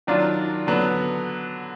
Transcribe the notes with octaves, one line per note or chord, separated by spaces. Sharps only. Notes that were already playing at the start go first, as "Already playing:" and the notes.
D#3 F#3 D4 F4
D3 F#3 B3